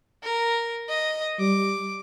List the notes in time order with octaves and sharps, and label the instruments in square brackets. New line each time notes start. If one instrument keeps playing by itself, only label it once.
[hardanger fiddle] A#4
D#5
[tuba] G3 [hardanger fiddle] D6